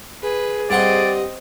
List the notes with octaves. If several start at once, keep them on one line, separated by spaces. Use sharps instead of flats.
G#4 B4
G2 C4 D5 D#5 F#5 C6